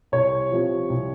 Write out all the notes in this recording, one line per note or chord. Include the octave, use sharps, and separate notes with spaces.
C2 C#5
C3 F3
C2